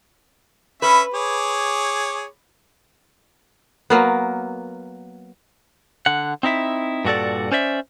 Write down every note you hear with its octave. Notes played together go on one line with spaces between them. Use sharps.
C#4 B4 E5
G#4 C#5 D6
F#3 A#3 B3
D3 F#5
C4 D#4 E4 E5
G2 A#2 F#4 A4 D5
C#4 C5 D5 E5